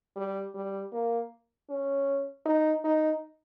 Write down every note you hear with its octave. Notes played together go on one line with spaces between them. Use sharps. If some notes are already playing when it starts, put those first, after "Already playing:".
G3
G3
A#3
C#4
D#4
D#4